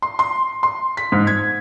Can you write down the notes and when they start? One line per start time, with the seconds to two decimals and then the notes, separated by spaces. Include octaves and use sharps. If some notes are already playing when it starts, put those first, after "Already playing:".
0.02 C6
0.19 C6
0.63 C6
0.97 B6
1.12 G#2
1.27 G#6